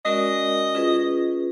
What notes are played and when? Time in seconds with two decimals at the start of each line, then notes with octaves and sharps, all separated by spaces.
0.05 G#3 C#4 F#4 A#4 D5 D#5
0.75 C#4 F4 G#4 B4